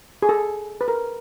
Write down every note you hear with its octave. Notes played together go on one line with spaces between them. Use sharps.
G#4
A4
B4
A#4